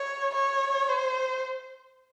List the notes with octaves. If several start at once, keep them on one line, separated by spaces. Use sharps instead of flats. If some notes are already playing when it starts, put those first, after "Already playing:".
Already playing: C#5
C#5
C5